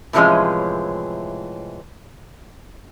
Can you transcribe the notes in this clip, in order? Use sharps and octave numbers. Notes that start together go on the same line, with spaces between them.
A2 C3 E3 F3 G#3 C#4